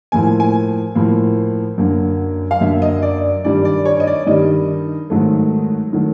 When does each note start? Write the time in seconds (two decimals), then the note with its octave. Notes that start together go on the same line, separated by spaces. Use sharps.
0.12 A2 F3 A#3 G#5
0.40 G#5
0.95 A2 F3 A#3
1.78 F#2 D3 F#3 A#3
2.51 F5
2.61 F#2 D3 F#3 A#3 E5
2.82 D#5
3.02 D5
3.44 G2 D#3 G3 D5
3.65 D5
3.85 C#5
4.00 D#5
4.07 D5
4.27 G2 D#3 G3 D#5
5.10 G#2 D#3 F#3 A3
5.93 D#3 F#3 A3